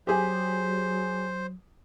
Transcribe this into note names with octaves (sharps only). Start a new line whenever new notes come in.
F#3 G4 G#4 C5